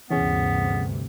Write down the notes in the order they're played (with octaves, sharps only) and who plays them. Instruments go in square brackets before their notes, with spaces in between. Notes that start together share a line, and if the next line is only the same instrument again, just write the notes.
[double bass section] D2 G2 C3 [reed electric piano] E3 C#4 G#4 [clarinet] B3